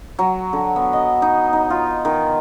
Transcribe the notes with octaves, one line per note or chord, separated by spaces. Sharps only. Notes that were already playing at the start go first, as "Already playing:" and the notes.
F#3
D3
B3
D#5
D#4
D#4
F4
D#3